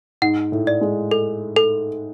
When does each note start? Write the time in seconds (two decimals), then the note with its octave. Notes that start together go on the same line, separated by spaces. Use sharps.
0.22 G#2 F#5
0.52 A2
0.67 D5
0.81 G#3
1.11 A4
1.56 A4